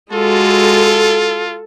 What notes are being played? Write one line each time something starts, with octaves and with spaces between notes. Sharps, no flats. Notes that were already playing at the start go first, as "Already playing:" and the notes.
G#3 F4 F#4 A4